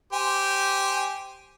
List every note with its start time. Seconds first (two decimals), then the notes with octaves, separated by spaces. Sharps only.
0.13 G4 C5 G#5